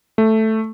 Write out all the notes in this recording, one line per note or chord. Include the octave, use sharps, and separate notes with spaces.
A3